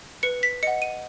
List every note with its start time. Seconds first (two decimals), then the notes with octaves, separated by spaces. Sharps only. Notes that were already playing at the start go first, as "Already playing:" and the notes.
0.23 B4 C#7
0.43 B6
0.63 D#5 F#5 C#7
0.82 D#7